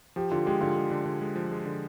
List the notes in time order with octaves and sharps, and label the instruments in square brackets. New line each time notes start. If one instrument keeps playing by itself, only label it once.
[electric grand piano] F3 [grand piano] G4
[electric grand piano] D3 [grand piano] F4
[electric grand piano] G#3 [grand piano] G4
[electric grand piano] D3 [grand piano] F4
[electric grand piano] G#3
D3
D3
G#3
F3
G#3
D3